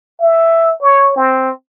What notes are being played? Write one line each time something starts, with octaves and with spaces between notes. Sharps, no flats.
E5
C#5
C4